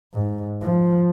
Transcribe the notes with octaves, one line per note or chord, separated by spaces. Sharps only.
G#2
F3